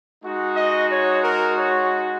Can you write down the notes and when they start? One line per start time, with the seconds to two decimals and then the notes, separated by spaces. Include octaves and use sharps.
0.23 G#3 D#4 F#4
0.56 D#5
0.91 C#5
1.24 A#4
1.58 C#5